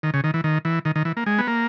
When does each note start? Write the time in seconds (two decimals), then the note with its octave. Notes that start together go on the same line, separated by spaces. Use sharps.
0.03 D#3
0.14 C#3
0.24 D#3
0.34 E3
0.44 D#3
0.65 E3
0.85 D#3
0.95 D#3
1.05 E3
1.17 A#3
1.26 G#3
1.39 B3
1.47 A#3